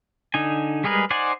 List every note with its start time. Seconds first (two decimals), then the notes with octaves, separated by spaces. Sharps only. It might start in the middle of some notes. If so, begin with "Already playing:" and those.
0.34 D3 D#4 G#5
0.84 G3 G#3 G#4 A#4 B4
1.10 D#4 C5 D5 F#5 G#5